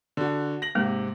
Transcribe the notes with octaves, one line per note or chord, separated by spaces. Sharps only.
D3 F#4
A#6 F#7
G#2 C3 G#3 A#3